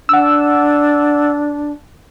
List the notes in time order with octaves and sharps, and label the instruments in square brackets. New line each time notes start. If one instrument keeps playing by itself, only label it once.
[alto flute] D4 [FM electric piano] F#5 E6